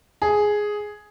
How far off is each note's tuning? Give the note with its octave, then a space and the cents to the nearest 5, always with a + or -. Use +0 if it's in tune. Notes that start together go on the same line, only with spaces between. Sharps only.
G#4 +5